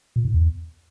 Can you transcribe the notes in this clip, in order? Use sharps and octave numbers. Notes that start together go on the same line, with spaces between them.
A#2
G#2
E2